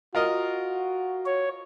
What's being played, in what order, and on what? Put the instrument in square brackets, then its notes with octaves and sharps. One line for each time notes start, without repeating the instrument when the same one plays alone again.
[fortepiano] F4 A#4 D#5 [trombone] F#4
[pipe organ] C#5